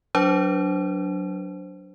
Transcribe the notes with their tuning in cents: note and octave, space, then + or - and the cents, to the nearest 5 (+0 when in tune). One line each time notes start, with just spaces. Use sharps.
F#3 +0 D4 -10 C5 +0